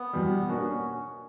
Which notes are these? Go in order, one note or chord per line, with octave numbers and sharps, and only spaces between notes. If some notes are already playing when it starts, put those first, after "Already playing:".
Already playing: B3
E2 B2 G3
B2 A#3 C#4 D4 F#4